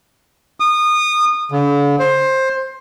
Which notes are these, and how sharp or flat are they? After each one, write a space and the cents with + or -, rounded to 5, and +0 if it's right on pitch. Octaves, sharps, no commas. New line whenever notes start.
D#6 -25
D3 -45
C5 +15